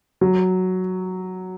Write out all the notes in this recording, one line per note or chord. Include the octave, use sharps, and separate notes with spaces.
F#3